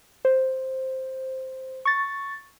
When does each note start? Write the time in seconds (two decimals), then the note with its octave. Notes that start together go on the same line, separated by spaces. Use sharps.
0.25 C5
1.85 C#6 A6